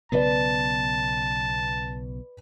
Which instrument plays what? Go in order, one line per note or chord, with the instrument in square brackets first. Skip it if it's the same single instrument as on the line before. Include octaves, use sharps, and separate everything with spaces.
[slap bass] B1 C#3 B3 [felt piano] B4 D5 [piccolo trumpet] A5